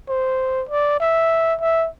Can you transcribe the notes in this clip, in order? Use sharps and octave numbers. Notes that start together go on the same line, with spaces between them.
C5
D5
E5
E5